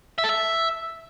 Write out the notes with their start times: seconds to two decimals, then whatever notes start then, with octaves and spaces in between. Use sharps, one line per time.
0.18 E5
0.24 A4
0.29 E5